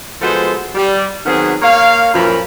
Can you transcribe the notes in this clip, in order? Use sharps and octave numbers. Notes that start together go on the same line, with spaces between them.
F3 G#3 B3 F#4 A4 C5
G3
D#3 F#3 B3 C4 G#4
A#3 A#4 C#5 F5
F#2 A#2 E3 F3 A#4 B5